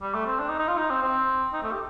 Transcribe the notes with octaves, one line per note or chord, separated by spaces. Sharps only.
G3
A3
C4
D4
D#4
D#4
F4
D#4
C4
C4
D#4
A3
G4